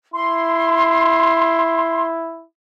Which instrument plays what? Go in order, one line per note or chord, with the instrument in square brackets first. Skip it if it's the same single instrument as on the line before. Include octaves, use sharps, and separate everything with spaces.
[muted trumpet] E4 [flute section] C6